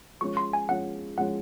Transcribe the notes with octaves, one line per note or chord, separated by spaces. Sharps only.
F3 G#3 C#4 C#6
C6
G#5
F3 G#3 C#4 F#5
F3 G#3 C#4 F#5